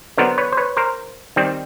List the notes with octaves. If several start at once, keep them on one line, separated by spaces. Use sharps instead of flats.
D3 F#3 B3 A#4 C5
B4 C#5
C5
B4 C#5
A#4 C5
D#3 G3 C4